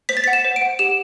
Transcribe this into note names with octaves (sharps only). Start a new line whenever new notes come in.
C5 B6
A6
F#5 B6
E7
C5
D7
F#5
G4 E7